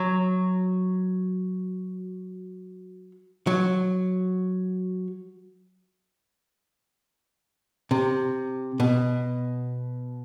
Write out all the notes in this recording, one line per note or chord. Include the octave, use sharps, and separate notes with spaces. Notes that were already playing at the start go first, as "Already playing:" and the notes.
Already playing: F#3
F#3
C3
B2